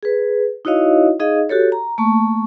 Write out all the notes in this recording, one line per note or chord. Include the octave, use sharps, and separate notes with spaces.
G#4 B4
D#4 E4 F#4 C#5 D#5 F5
D#4 G#4 D#5 F5
F#4 G4 A4 C#5
A#5
A3 A#3 A5 C#6